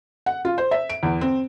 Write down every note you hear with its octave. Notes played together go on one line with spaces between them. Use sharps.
F#5
F4
C5
E5
D7
E2
C4